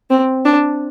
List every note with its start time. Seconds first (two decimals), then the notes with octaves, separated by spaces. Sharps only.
0.10 C4
0.45 D4